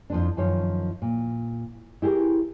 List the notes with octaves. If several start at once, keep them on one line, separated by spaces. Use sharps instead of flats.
F2 F3 D4
F#2 D#3 F3 C#5
A#2
E4 G4 G#4 A#4